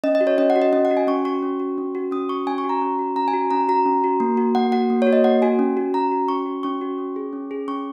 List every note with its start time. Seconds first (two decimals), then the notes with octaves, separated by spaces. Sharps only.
0.04 C#4 D#5
0.15 D#5
0.21 F#4
0.27 C#5
0.38 C#4 D#5
0.50 F#5
0.56 F#4
0.62 D#5
0.73 C#4 D#5
0.85 F#5
0.91 F#4
0.97 G#5
1.07 C#4 C#6
1.25 F#4 C#6
1.43 C#4
1.60 F#4
1.78 C#4
1.95 F#4
2.11 C#4 D#6
2.29 F#4 C#6
2.47 C#4 G#5
2.58 C#6
2.64 F#4
2.69 A#5
2.82 C#4
2.99 F#4
3.16 C#4 A#5
3.28 G#5
3.33 F#4
3.51 C#4 A#5
3.68 F#4 A#5
3.86 C#4
4.04 F#4
4.20 A#3
4.37 F#4
4.55 A#3 F#5
4.72 F#4 F#5
4.90 A#3
5.02 C#5
5.07 F#4
5.13 D#5
5.24 A#3 F#5
5.42 F#4 G#5
5.59 C#4
5.77 F#4
5.94 C#4 A#5
6.12 F#4
6.28 C#4 C#6
6.46 F#4
6.63 C#4 C#6
6.81 F#4
6.98 C#4
7.16 G#4
7.33 C#4
7.51 G#4
7.68 C#4 C#6